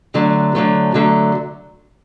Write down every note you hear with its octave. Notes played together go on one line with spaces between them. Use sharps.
D3 F#3 A3
D3 F#3 A3
D3 F#3 A3